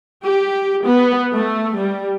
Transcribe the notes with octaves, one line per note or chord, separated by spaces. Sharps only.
G4
B3
A3
G3